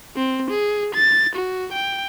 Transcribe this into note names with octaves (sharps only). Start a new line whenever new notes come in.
C4
G#4
A6
F#4
G5